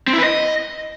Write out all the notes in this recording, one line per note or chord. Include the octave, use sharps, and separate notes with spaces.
C4
E4
B4
D#5